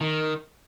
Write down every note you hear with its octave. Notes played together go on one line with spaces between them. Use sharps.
D#3